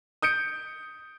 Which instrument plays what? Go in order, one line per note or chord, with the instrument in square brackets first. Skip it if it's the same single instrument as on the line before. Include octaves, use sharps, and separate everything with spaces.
[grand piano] D#6 G6 C#7 D7